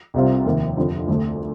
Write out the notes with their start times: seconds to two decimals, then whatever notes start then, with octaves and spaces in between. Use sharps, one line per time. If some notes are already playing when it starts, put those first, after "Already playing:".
0.14 C2 C3 G3 C4 F4
0.46 F1 D#2 D#3
0.77 F2 D3 F3
1.08 D2 D3 A3